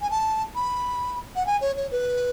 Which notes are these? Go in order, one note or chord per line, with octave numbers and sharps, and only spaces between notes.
G#5
A5
B5
F#5
G#5
C#5
C#5
B4